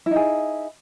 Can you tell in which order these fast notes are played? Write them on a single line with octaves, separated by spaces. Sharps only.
E4 D#4 G#4